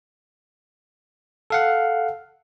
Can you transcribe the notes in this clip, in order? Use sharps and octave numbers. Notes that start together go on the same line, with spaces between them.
A4 F5 F#5